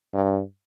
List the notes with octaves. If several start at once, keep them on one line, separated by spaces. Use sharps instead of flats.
G2